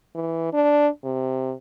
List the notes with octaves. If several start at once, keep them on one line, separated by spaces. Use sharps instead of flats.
E3
D4
C3